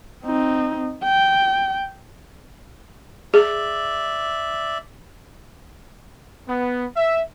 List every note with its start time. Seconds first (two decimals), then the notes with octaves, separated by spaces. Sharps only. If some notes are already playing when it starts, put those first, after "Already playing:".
0.24 C4 D#4
1.04 G5
3.34 G#4 D5 E5
6.48 B3
6.96 E5